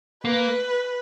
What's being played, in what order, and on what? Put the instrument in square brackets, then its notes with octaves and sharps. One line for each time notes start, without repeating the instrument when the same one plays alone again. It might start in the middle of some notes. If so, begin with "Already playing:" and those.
[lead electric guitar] A#3 [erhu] B4